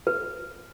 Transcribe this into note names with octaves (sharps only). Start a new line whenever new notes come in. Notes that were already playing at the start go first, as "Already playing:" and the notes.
B4